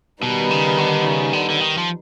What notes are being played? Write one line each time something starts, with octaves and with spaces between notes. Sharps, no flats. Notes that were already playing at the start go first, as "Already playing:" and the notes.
B2 D#3 G3 B3 D#4
C#3
D3
C#3
D3
D3
D#3
F3